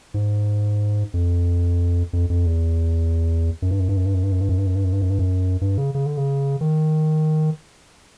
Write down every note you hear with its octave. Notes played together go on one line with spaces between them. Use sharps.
G#2
F2
F2
F2
E2
F#2
G2
F#2
G2
F#2
G2
F#2
G2
F#2
G2
F#2
G2
F#2
G2
F#2
G2
F#2
G2
F#2
G2
C#3
C#3
D3
C#3
D#3